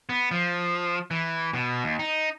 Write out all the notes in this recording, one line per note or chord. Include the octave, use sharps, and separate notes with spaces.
B3
F3
E3
B2
D#2
D#4